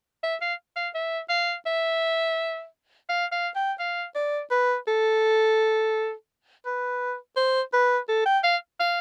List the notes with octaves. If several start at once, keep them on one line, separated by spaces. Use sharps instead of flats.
E5
F5
F5
E5
F5
E5
F5
F5
G5
F5
D5
B4
A4
B4
C5
B4
A4
G5
F5
F5